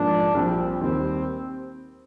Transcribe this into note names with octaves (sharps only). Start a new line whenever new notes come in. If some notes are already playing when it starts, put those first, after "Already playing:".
Already playing: G#2 F3 A#3 D4
A#1 A#2 G3 C4
D#2 D#3 G3 C4